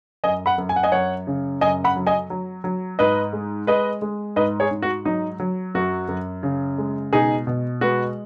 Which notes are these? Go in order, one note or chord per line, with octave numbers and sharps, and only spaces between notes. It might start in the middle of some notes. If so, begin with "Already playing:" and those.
F#2 D#5 G#5
F#5 B5
F#2
G#5
F#5
D#5 G#5
F#2 C#5 F#5
C#3
F#2 D#5 G#5
F#5 B5
F#3
D#5 G#5
F#3
F#3
G#2 B4 D#5
G#3
G#3 B4 D#5
G#3
G#2 B4 D#5
G#4 C#5
G#2
F#4
F#3 D#4
F#3
F#2 F#4
F#2
C#3
G#3
B2 D#4 G#4
B2
G#3 F#4 B4